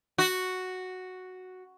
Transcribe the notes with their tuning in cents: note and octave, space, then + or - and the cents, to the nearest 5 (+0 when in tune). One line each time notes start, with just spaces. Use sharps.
F#4 +0